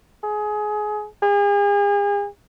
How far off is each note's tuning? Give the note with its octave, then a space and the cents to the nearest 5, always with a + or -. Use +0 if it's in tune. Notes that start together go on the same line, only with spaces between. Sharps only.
G#4 +20
G#4 -40